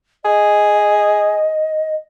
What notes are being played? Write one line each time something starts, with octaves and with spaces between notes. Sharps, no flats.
G#4 D#5